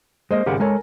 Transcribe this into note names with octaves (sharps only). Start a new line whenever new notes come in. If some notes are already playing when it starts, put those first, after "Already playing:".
G#3 A#3 C5 D#5
G#1 C#3 G4 A#4 F#5
G#3 A4 A#4 C#5 G#5